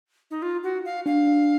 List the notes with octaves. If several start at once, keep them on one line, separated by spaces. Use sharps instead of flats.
D#4
F4
F#4
F5
D4 F5
D4